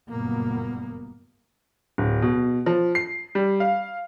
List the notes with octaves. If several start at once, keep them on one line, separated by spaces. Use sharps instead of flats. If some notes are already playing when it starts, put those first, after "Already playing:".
F#1 G2 A#2 A#3 B3
D1
B2
F3
C7
G3
F5